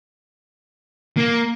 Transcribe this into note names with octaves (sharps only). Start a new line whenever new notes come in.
A#3